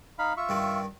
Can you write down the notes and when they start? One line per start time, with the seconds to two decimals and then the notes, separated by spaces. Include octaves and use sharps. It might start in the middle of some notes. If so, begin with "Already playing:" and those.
0.19 D#4 F5 B5
0.37 F4 E5 C#6
0.49 G2 D#3